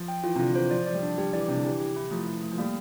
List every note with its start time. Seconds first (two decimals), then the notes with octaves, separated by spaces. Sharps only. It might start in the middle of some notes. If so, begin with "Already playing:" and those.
Already playing: F3
0.08 G5
0.24 E3 F4
0.36 C3
0.39 D3 F4
0.55 E3 C5
0.71 F3 D5
0.87 F3 D5
0.94 G3
1.03 D4
1.18 G3 G4
1.33 E3 D5
1.48 C3 D4
1.57 D3
1.65 E3 G4
1.80 G4
1.96 E4
2.11 F3 A3
2.27 A3
2.43 A3
2.51 F3
2.58 G3 A#3